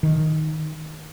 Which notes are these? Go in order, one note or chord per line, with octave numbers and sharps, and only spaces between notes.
D#3